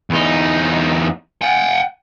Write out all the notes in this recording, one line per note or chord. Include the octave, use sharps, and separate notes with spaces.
E2 D#4
F#5 G5